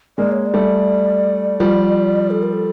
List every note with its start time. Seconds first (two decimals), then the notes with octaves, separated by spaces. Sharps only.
0.18 G#3 A#3 D5
0.32 C#5
0.46 D5
0.54 G3 A3
1.60 F3 G3
2.30 A4
2.42 A#4
2.53 A4